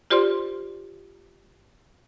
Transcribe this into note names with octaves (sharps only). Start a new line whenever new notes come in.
F4 G4 C5 D5 C6 F6